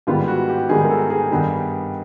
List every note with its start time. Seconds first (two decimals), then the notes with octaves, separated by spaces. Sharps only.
0.07 G#2 D#3 G3 B3 F4
0.28 F#4
0.49 G4
0.69 G#2 D#3 G3 B3 G#4
0.84 A#4
0.90 A4
1.10 G#4
1.31 G2 D#3 G3 B3